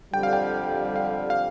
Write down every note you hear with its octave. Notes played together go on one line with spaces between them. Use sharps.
F2 D3 G3 G5
F5
G5
F5
F5